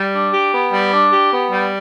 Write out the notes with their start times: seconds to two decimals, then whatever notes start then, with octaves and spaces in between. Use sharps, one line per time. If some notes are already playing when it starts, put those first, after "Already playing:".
Already playing: G3
0.14 D4
0.34 G4
0.53 B3
0.73 G3
0.93 D4
1.12 G4
1.32 B3
1.52 G3